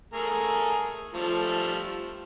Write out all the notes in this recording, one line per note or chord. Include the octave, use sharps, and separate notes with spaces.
A3 G#4 A#4
F3 G3 A3